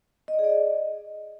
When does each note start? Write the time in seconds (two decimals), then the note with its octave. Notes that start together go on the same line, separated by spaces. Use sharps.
0.28 D#5
0.33 D5
0.39 G#4
0.44 D5
0.50 D#5